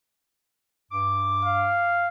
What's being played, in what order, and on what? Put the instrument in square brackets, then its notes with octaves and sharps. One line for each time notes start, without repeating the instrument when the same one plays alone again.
[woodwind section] G2 D6
[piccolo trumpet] F5